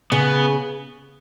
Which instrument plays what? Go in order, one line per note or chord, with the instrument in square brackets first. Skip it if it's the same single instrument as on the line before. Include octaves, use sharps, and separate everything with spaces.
[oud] C#3 [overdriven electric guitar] B3